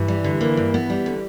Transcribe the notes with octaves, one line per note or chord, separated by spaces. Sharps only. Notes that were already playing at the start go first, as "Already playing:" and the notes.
Already playing: G2 E3
G3
D3
A#3
G2
B3
G3
D3